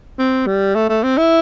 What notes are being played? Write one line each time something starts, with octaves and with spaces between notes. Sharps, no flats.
C4
G3
A3
A3
C4
E4